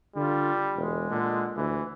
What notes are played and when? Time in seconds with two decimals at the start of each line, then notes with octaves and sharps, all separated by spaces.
0.16 D3 G3 F4
0.76 E1 G#3
1.10 A#2 D3
1.57 D2 E3